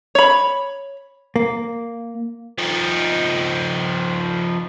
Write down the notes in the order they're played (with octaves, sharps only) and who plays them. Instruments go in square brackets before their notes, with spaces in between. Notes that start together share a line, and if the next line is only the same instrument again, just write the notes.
[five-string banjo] C#5 B5
[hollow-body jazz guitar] A#3
[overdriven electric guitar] F3 D#4